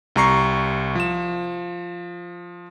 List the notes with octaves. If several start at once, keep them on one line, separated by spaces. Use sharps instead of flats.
C2 G3 A#5 C#6 C7
F3 E7